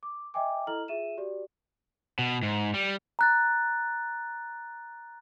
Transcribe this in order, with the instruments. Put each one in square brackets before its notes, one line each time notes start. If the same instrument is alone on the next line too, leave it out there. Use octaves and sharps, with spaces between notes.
[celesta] D6
D#5 E5 G5 G#5 D6
E4 A4 D#5 A#5 F6 F#7
F4 G#4 E5 D#7 E7
F#4 G4 D5
[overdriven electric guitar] B2
G#2
G3
[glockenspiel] A#5 F#6 A6